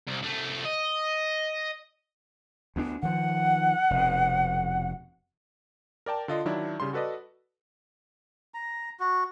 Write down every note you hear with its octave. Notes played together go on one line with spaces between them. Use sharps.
C2
C2 A3
D#5
D2 B3 D4
D#3 F3 F#5
F1 B2
A#4 D5 G5 A5
D3 F4 D#5
D#3 F#3 D4 E4
C#3 G3 C6
F#4 A4 B4 D5 D#5
A#5
F#4